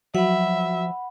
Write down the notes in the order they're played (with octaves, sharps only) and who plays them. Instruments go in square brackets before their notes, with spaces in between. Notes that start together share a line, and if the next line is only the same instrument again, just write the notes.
[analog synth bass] F3 [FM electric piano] F#3 [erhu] E5 [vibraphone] F#5 B5